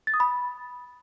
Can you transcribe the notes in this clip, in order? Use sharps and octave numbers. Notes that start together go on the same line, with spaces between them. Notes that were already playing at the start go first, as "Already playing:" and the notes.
A6
D#6
B5